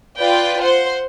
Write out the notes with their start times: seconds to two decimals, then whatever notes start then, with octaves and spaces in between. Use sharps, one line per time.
0.19 F4 B4 D5 G5
0.63 C5 F#5 C6